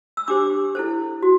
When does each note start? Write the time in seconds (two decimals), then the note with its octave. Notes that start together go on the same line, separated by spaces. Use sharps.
0.17 E6
0.28 D4 G4 C5 D6
0.75 E4 A4 C5
1.23 F#4